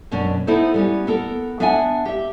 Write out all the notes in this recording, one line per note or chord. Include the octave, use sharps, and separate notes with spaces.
F#2 B2 C#4 D4
B3 D#4 E4 A4 C5
G3 B3 C#4
B3 A4 A#4
B3 D4 B4 E5 F#5 G#5
G4 E5